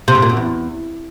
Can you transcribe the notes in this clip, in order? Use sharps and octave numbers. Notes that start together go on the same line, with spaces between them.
C3
G#2
A#2
F#2
E2